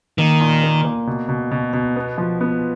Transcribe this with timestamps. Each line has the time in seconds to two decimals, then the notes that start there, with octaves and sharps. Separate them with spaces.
0.18 D#3 A#3
0.40 A#2
0.63 A#3
0.85 A#3
1.07 B2
1.29 B2
1.51 B2
1.73 B2
1.96 B3
2.18 F3
2.41 B3